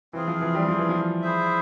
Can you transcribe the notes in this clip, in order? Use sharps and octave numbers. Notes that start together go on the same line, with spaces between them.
E3 C4 F4 G#4
F3
E3
G3
F3
E3
F3
E4 G#4 C5 E5